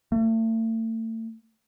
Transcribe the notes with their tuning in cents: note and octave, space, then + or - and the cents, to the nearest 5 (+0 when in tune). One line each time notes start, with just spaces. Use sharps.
A3 +40